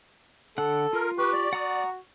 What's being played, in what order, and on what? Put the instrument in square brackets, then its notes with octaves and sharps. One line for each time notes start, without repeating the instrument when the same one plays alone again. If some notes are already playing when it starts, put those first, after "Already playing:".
[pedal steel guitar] D3 F#5 F#6 [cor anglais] A4
[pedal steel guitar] F4 [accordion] A#4
[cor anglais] G4 [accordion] B4 [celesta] C#6
[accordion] D5
[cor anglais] F#4 [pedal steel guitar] F#5 A#5 D#6